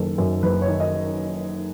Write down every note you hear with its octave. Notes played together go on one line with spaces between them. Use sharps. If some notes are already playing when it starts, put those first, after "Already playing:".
Already playing: F#1 D#3 A4
F#2
F#1 B4
C#5
D#3
D#5